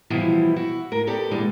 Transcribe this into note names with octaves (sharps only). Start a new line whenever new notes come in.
B2 E3 F3 G3 E4
E4 F#4
A2 A#4
B3 G4 A4 D5
A#2 D3 E3 G3 G#3